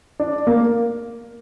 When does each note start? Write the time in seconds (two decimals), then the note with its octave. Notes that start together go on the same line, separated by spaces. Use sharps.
0.20 D4
0.47 A#3